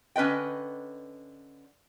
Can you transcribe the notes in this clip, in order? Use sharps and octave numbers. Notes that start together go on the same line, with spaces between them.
D3 C#4 B4 D#5 G5